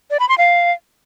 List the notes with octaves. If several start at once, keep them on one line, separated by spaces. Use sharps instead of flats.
D5
B5
C6
F5